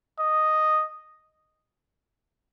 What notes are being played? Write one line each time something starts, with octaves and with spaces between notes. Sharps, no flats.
D#5